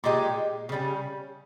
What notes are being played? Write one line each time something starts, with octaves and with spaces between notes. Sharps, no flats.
A#2 G#3 D#4 G4
C#3 G3 C#4